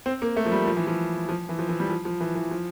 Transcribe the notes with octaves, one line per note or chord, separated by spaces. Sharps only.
C4
A#3
A3
F3
G3
F3
E3
F3
F3
E3
F3
E3
G3
F3
F3
E3
E3
F3